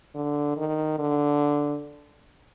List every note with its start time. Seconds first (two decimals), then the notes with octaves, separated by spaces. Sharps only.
0.15 D3
0.57 D#3
0.99 D3